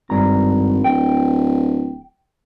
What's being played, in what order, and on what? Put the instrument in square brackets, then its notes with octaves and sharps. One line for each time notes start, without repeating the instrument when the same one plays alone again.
[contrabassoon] G#1 [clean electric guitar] G2 A#5
[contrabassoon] D1 [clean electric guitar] G5